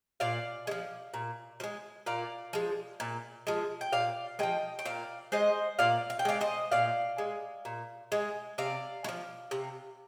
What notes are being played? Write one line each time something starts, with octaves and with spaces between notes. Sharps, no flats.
A#2 D5 F5
G#3
F3
A#2
F3
G#3
A#2 D5 F5
F3 G#3
A#2
F3 G#3
G5
A#2 D5 F5
F3 G#3 D#5 G5
G5
A#2 D5 F5
G#3 C5 D#5
A#2 D5 F5
F5
G5
G#3 D5 F5
C5 D#5
A#2 D5 F5
G#3
A#2
G#3
C3 D5 F5
G#3
F3
C3